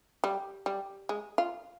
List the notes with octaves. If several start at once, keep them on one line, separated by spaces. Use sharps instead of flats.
G3
G3
G#3
F4